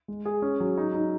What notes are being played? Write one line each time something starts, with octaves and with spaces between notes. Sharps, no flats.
G#3
G#4
C#4
F#3
D#4
D#4